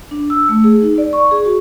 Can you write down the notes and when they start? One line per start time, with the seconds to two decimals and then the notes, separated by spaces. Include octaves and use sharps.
0.11 D4
0.30 E6
0.49 A3
0.64 G#4
0.82 D#4
0.98 D5
1.13 C#6
1.31 G#4
1.45 F#4